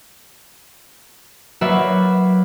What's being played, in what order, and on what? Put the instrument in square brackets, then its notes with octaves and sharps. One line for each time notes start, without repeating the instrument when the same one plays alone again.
[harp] F#3 A#3 F#4 B4 D5 E5